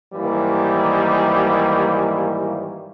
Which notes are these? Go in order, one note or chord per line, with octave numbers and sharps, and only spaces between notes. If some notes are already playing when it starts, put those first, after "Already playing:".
G#2 D#3 E3 G3 A#3